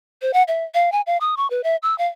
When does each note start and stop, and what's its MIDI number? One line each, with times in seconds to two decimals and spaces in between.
0.22 0.31 72
0.33 0.43 78
0.48 0.64 76
0.74 0.92 77
0.92 1.01 80
1.07 1.17 77
1.21 1.35 87
1.37 1.49 85
1.50 1.63 71
1.64 1.76 76
1.83 1.97 88
1.98 2.08 77